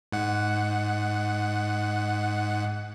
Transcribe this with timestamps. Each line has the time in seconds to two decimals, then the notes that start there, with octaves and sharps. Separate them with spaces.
0.12 G#2 F#5